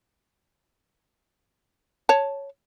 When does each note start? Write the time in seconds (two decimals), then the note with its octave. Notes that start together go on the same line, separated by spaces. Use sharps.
2.09 C#5 A5